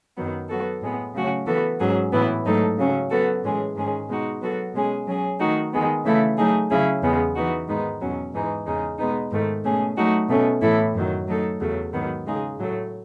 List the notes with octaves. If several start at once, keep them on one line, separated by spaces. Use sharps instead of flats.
F#2 D#3 F#3 B3
F#3 B3 F#4 A4
A2 G#3 B3
C#3 F#3 A3 C#4 F#4
E3 B3 F#4 A4
G#2 F#3 C#4 G#4
A2 E3 B3 E4
G#2 F#3 A3 D#4 A4
C#3 F#3 C#4
F#3 B3 F#4 A4
A2 E3 G#3 C#4 G#4
G#2 D#3 G#3 C#4 G#4
B2 G#3 D#4 F#4
F#3 B3 F#4 A4
B2 G#3 C#4 G#4
F#3 C#4 G#4
D#3 A3 D#4 F#4
D#3 G#3 B3
C#3 E3 A3 E4 A4
F#3 A3 D#4 G#4
C#3 F#3 C#4 E4 G#4
E2 C#3 G#3 B3
E3 B3 D#4 F#4
G#2 D#3 G#3 B3 D#4
E2 B2 F#3 C#4
G#2 E3 G#3 D#4
E2 C#3 G#3 D#4
B2 G#3 B3 D#4
G#2 D#3 A3
B2 A3 C#4 G#4
F#3 A3 D#4 F#4
B2 A3 C#4
A2 E3 A3 E4 A4
F#2 D#3 F#3
F#3 A3 D#4 A4
E2 C#3 F#3 A3
G#2 D#3 F#3 B3
C#3 G#3 D#4 G#4
A2 F#3 A3